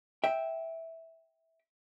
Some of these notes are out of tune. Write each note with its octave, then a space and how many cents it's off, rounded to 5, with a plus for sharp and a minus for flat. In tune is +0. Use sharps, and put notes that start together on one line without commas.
E5 -10 G5 +0